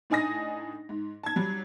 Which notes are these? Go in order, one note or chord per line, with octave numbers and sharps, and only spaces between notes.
A2 D4 D#4 G#5 D#6 A#6
G#2
A5 G#6
F#3 G3